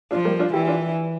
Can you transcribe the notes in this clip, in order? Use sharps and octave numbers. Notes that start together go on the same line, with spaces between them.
F3 D4 F4
G3 A#3
D4 F4
E3 E4 G4
D4 F4